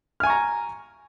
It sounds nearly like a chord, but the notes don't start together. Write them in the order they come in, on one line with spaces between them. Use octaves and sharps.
F6 G#5 C#6 A#5